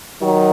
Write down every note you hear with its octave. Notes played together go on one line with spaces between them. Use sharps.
D#3 F#3